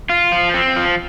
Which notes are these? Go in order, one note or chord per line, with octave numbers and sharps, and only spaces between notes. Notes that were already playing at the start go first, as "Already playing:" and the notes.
F4
F3
C4
F3